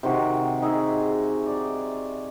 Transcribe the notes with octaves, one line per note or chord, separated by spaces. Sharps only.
C3 D#3 F#4
D#4 G#4 E5
D5